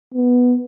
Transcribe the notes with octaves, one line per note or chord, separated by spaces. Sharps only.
B3